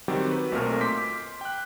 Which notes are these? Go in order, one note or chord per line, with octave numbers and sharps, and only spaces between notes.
D#3 F#3 G3 C4 F#4 G4
B4
B1 A#2 A3 C4 A#4 F6
C6 D6 G6 B6
G5 F#6